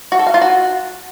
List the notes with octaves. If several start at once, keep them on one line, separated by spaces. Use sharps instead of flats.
F#4
A4
F5
F4
F#4